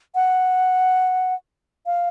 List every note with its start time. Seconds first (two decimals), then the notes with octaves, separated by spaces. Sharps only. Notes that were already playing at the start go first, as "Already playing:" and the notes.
0.15 F#5
1.86 F5